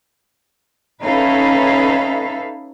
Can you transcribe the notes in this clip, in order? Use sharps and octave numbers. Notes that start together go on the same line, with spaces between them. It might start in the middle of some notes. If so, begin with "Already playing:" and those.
C#4 D#4 A4 B4 E5 F5